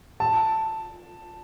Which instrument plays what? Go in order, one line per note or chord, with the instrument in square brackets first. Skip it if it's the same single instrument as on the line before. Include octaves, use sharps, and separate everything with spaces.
[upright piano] A5